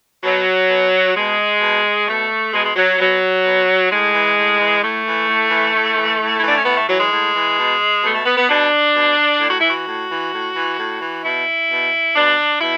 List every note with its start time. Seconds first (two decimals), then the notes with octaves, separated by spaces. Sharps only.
0.24 B2 F#3
0.70 B2
1.16 B2 G#3
1.61 B2
2.07 B2 A3
2.53 B2 G#3
2.65 G#3
2.76 F#3
2.99 B2 F#3
3.45 B2
3.90 A2 G#3
4.13 E3
4.37 A2
4.59 E3
4.82 A2 A3
5.05 E3
5.28 A2
5.51 E3
5.74 A2
5.97 E3
6.20 A2
6.39 E3 E4
6.48 D4
6.56 C#4
6.65 A2 B3
6.77 A3
6.88 E3 F#3
7.00 G#3
7.12 A2
7.34 E3
7.57 B2
8.03 B2 A3
8.14 A3
8.26 B3
8.37 B3
8.49 B2 D4
8.95 B2
9.40 A2
9.50 F#4
9.60 E3 E4
9.70 F#4
9.86 A2
10.09 E3
10.32 A2
10.55 E3
10.78 A2
11.01 E3
11.24 B2 E4
11.70 B2
12.15 B2 D4
12.61 B2 E4